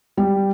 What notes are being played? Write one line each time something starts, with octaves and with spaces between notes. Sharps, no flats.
G3